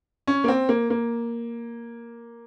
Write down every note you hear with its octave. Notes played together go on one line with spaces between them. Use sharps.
C#4
A#3
C4
A#3
A#3